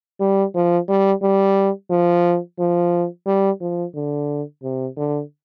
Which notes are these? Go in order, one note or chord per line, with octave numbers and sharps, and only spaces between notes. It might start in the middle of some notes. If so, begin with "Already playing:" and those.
G3
F3
G3
G3
F3
F3
G3
F3
D3
C3
D3